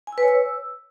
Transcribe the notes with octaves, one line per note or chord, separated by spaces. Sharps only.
G#5
E6
B4
C#5
E6